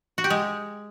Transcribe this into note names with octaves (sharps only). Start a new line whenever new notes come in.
F#4
G4
G#3